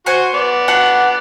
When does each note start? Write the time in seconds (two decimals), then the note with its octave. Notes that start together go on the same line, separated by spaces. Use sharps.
0.06 F#4 C5 G#5 C#6
0.34 B3 D5
0.68 D4 F#4 F#5